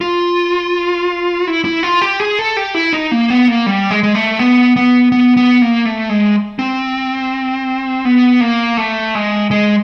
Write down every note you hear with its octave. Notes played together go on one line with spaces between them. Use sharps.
F4
E4
E4
F4
G4
G#4
A4
G4
E4
D#4
A#3
B3
A#3
G3
G#3
G#3
A3
B3
B3
B3
B3
A#3
A3
G#3
C4
B3
A#3
A3
G#3
G#3